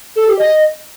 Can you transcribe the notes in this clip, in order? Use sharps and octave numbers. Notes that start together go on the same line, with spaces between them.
A4
G4
D#5